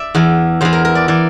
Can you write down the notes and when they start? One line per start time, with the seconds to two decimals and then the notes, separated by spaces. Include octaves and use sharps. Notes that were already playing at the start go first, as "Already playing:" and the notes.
Already playing: D5 E5
0.15 E2 E3
0.61 E2 E3 C5
0.73 A#4
0.85 A#4
0.95 D5
1.08 E3 D5